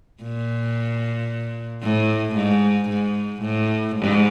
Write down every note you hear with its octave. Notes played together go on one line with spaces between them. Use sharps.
A#2
A2
G#2
G#2
A2
G#2